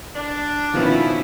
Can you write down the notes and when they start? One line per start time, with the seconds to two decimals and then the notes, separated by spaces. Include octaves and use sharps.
0.15 D4 D5
0.74 B2 D#3 F3 B3 C#4 E4